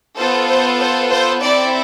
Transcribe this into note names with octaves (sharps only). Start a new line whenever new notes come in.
B3 F4 A4 C5
C5
C5
C5
C4 E4 A4 D5